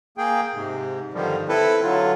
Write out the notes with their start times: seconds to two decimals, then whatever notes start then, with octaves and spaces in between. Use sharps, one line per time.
0.18 A#3 G#4 G5
0.54 G#2 C3
1.13 G2 D3 D#3 F3 G3
1.48 C4 E4 A4 B4
1.82 D3 F#3 F4